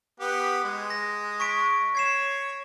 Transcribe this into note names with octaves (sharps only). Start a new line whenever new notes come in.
B3 G4
G#3
A#6
C#6 B6 D7
C#5 G#6 C7 E7